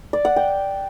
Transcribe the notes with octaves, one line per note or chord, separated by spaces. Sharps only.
D5
F#5
G5